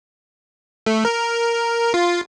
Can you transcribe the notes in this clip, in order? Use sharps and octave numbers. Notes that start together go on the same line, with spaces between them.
A3
A#4
F4